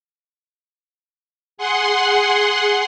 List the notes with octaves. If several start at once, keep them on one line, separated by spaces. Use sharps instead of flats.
G#4 F#5 C6